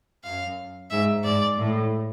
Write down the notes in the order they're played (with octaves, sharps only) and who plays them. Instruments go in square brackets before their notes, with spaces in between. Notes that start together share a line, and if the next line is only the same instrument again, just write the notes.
[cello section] F#2 [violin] F5
[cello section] G#2 [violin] E5
[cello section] G#2 [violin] D5
[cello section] A2